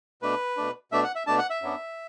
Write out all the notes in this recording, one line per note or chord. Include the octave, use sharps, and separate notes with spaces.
B2 A3 D4 B4
B2 A3 D4
B2 A3 D4 E5
F#5
E5
B2 A3 D4 A5
F#5
E5
F#2 F#3 B3 D4